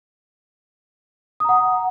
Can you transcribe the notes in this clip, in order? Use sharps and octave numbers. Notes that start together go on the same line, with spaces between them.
F#5 A#5 D#6